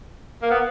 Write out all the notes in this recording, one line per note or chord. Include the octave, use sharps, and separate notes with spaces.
A#3
B3